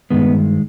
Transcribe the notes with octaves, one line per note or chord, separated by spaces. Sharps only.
G2 D#3 G#3 B3